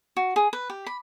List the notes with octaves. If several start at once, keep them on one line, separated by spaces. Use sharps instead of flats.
F#4
G#4
B4
G4
B5